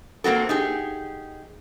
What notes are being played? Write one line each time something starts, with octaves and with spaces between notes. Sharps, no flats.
A#3 C4 F#4 A4
D#4 G4 G#4